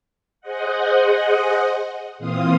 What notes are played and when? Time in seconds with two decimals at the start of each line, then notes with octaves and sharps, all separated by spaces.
0.41 G#4 C5 D#5 F#5
2.18 A#2 E3 C4 F5 C6 D#6